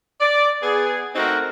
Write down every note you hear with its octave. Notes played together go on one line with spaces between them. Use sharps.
D5
B3 G#4
A3 C4 D#4 F#4 A#4